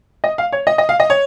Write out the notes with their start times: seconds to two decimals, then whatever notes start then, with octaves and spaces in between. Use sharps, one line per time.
0.24 D#5
0.38 F5
0.52 C#5
0.67 D#5
0.78 D#5
0.89 F5
1.00 D#5
1.10 C#5